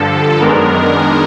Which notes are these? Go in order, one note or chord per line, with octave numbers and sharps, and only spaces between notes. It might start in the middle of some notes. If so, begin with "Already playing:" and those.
Already playing: G2 D3 F3 A4
F#2 D#3 G#3 B3 D4 A#4